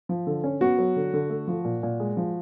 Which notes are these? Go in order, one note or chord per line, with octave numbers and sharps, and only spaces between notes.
F3
D3
C#4
B3 F#4
F#3
D3
D3
A3
F3
A#2
A#2
G#3
F3